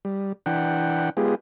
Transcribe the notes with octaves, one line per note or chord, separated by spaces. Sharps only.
G3
E3 D4 F#5 G5
G#3 B3 F4 G4 G#4